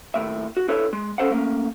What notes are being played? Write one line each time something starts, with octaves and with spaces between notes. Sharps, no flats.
D#2 A2 E5
F#4
D4 E4 A4 B4 C#5
G#3
C#4 E4 A4 C5 F5 F#5
A3 A#3 C#4